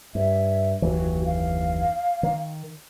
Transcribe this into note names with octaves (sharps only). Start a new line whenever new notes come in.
G2 E5
F#1 D#2 E3 F#4
F5
D#3